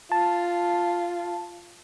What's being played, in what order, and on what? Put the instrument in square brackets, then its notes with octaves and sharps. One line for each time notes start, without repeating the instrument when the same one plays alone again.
[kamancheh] F4 [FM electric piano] A5